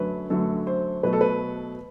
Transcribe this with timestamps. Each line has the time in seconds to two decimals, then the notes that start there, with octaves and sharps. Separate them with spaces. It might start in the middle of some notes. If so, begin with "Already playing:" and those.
Already playing: F#2 D3 F#3 A3 B4
0.30 F#2 D3 F#3 A3 A4
0.67 C5
1.03 B2 F#3 A3 B4
1.13 A4
1.21 B4